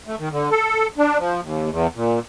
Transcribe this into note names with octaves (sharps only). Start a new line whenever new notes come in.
A3
D#3
D3
A4
D4
F3
D#2
E2
A#2